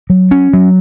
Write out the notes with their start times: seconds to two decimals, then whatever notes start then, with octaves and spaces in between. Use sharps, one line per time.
0.10 F#3
0.31 C#4
0.53 F#3